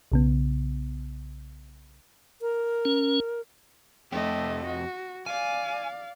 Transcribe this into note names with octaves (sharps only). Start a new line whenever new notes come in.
B1 C#3 B3
A#4
C#4
F2 A3 G4 D#5
F#4
D5 F5 G#5